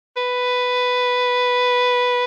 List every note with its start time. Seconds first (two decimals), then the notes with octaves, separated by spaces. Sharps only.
0.17 B4